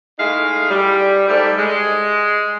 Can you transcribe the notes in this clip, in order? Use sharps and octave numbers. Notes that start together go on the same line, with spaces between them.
G#3 A3 D#4 E4 G#4 F5
G3
G#2 G3 A3
G#3